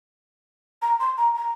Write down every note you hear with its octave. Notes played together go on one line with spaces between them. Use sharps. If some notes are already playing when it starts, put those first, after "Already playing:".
A#5
C6
A#5
A#5